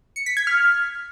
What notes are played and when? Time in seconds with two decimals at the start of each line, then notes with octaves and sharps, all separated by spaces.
0.16 C#7
0.26 B6
0.37 G#6
0.47 F6